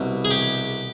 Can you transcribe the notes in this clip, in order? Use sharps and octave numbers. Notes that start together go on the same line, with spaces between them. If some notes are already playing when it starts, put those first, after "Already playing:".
Already playing: C2 B2
G#4
G4